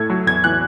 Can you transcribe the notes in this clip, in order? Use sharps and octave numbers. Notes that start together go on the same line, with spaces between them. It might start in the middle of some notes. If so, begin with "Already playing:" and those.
Already playing: A2 A3 G#6
F#3
E2 G#6
E3 F#6